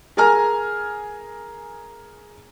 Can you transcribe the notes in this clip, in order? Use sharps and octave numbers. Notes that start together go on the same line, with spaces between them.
G#4 A#4 G#5 A#5 F6